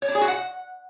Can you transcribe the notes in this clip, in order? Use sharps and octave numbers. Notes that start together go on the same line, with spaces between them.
C#5
D4
G#4
F#4
F#5